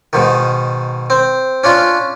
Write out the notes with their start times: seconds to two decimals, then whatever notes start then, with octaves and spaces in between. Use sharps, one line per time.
0.13 G#2 B2 D#3
1.10 C4
1.64 C#4 D4 F4